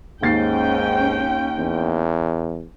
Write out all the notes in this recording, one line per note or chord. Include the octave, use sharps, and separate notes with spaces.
D#2 G#2 C#4 G5 A6 C7
E2